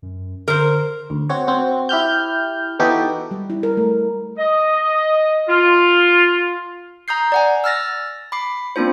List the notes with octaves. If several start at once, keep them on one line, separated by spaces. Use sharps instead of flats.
F#2
D3 A#4 C5
D2
C4 F#4 C#5
C4 F#4
E4 G4 F6 G6
E3 B3 D#4 F#4 G4 A4
G3
E4
A#4
A3
D#5
F4
A#5 D#6 G6 C7
D5 F#5 G#5
E6 F6 A6 A#6
B5 D6 C7
A#3 C4 D4 F4 C5